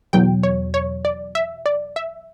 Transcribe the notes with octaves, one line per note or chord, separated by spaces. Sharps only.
E2 B2 F#3 G5
C#5
C#5
D5
E5
D5
E5